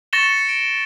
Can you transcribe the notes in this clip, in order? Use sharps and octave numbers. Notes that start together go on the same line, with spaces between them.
C#6 A6 A#6 C#7 E7 G7
C#7
D7